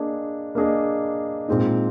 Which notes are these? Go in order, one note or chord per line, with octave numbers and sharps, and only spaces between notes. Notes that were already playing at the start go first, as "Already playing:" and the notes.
Already playing: A#3 D4 G#4 D#5
A#3 D4 G#4 D#5
A#2 G#3 C4 D#4